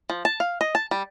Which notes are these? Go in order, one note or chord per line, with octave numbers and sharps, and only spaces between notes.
F3
A5
F5
D#5
A5
G3